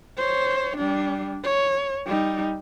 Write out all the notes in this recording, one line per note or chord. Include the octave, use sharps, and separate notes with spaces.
C5 C#5
G3 D4
C#5
G3 D#4